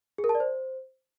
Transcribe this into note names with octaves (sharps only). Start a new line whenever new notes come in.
G#4
A#4
A5
D5
C5